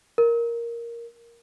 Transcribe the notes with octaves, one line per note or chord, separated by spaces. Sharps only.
A#4